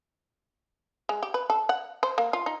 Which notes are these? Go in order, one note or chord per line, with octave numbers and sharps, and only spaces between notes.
G#3
G4
B4
A4
F#5
C5
A#3
F4
D#4